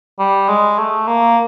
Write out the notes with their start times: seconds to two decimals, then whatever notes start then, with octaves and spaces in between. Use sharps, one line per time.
0.19 G3
0.49 G#3
0.78 A3
1.08 A#3